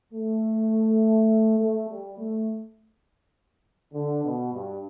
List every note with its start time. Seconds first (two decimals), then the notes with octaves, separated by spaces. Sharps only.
0.13 A3
1.59 A3
1.89 G3
2.18 A3
3.94 D3
4.24 B2
4.53 G2